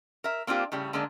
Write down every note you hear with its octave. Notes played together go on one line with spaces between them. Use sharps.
A#4 E5
A#3 C4 D4 F4 G4
A2 C#3 G3
D3 G#3 A#3 D4